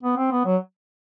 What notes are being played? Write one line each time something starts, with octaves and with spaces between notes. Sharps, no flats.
B3
C4
B3
F#3